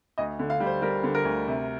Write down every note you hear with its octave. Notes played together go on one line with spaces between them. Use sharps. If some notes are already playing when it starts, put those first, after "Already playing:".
D2 D#5
D3
F5
G3
C5
G3 A#4
D3
A#4
D2
C3